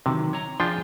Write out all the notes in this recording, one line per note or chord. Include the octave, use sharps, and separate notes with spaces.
C3 D#3 E3 F#3
C#5 A#5
F3 D4 F4 G#4 G5